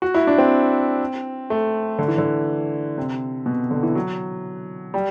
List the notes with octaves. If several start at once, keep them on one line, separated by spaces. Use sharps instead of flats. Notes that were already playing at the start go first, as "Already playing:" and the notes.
F#4
E4
D4
C4
A3
D3
E3
D3
C3
B2
D3
E3
F#3
G3